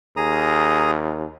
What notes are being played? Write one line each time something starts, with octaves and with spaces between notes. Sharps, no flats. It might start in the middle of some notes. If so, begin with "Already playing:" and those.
D#2 G#4 A#5 D#6